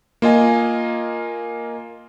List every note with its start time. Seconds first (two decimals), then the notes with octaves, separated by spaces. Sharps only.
0.22 A#3 F4 D#5 G#5